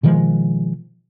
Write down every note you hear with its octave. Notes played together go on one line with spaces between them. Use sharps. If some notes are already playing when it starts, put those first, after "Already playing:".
B2 D#3 F3 G#3